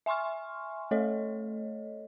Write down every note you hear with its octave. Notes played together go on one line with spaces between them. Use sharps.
E5 G#5 C6 C#6 F6
A3 A4 C#5 D#5